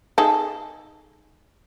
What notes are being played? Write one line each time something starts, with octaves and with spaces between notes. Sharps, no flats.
D#4 G#4 A4